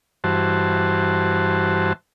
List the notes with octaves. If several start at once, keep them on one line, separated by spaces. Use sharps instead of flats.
G2 E3 F#4 C5 A5